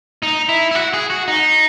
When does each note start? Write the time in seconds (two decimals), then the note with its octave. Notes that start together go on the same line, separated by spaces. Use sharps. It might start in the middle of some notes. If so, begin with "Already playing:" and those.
0.23 D#4
0.49 E4
0.71 E4
0.75 F#4
0.93 G#4
1.10 F#4
1.28 D#4